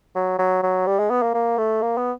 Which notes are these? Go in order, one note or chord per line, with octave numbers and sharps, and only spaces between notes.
F#3
F#3
F#3
G3
G#3
B3
A#3
A#3
A3
A#3
B3